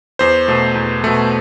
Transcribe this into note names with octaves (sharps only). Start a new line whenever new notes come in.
E2 C5
B2 A3
E2
B2 A3